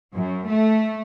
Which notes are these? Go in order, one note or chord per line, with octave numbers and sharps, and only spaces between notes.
F#2
A3